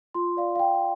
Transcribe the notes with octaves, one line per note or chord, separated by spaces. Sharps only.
F4 C6
D5 F5
F5
F4 G5